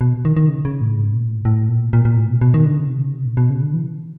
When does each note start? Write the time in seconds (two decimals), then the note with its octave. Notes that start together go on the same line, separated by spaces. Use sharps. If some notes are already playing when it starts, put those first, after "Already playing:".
0.01 B2
0.25 D#3
0.37 D#3
0.49 C#3
0.65 C#3
0.81 A2
0.97 G#2
1.13 A#2
1.29 A2
1.45 A2
1.69 A#2
1.93 A#2
2.05 A#2
2.17 A2
2.30 B2
2.41 B2
2.54 D#3
2.65 D3
2.78 C#3
2.90 C3
3.02 C#3
3.14 C3
3.25 A#2
3.37 B2
3.50 C#3
3.62 D3
3.74 E3